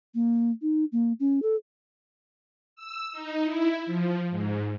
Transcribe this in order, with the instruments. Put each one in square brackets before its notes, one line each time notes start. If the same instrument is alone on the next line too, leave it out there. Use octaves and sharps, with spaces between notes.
[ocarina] A#3
D#4
A#3
C#4
A4
[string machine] E6
D#4
E4
F3
G#2